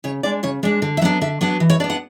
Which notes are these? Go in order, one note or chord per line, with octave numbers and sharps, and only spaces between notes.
C#3 C#5
G#3 D4 D5
C#3 C#5
G#3 D4 D5
D3
E5
F#3 B3 D4 F#5
D3 E5
F#3 B3 D4 F#5
E3
C#5
B3 D4 D5
F#5